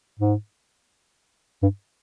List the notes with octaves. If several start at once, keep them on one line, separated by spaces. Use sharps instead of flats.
G#2
G2